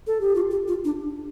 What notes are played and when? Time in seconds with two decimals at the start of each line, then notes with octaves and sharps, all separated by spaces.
0.07 A4
0.21 G4
0.35 F4
0.51 G4
0.68 F4
0.85 D4